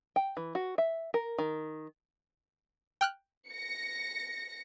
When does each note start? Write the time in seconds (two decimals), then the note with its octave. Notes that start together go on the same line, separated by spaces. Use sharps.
0.16 G5
0.37 E3
0.55 F#4
0.78 E5
1.14 A#4
1.38 D#3
3.01 G5 F6 F#6
3.50 A#6 C#7